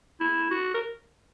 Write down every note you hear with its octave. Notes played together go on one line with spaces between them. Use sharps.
E4
F#4
A#4